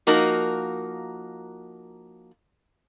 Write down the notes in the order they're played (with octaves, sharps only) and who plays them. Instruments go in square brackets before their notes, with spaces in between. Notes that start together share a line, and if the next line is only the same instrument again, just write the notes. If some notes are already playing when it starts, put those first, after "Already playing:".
[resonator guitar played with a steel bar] F3 A#3 D#4 F#4 A#4